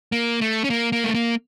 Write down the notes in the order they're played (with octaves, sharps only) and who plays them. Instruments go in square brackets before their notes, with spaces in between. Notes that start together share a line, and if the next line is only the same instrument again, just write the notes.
[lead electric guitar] A#3
A3
C#4
A#3
A#3
A3
A#3